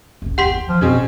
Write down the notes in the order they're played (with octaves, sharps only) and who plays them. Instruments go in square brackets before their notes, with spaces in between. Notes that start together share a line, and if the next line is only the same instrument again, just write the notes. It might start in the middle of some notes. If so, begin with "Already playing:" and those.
[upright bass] F#1 C2
[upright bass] G1 D#2 [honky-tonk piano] G4 [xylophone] F#5 C6 B6
[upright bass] D3
[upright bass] E3 [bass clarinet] F3
[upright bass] F2 [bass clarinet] B2 [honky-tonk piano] C4 C#4 G#4
[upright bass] A1